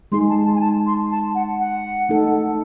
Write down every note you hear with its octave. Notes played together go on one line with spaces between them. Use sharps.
G#3 D#4 G#4 C6
A5
A5
G#5
A5
C6
A5
F#5
F#5
A3 D#4 A4